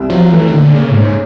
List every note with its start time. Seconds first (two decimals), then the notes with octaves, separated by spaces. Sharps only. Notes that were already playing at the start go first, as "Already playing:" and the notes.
Already playing: C2
0.10 F3 F#3
0.31 E3 A3
0.48 D#3
0.52 A#2 D3
0.75 C#3 A#3
0.91 A2
0.95 G#2 C#4